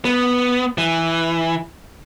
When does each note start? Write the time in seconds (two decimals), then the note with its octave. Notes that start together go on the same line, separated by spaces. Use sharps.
0.05 B3
0.78 E3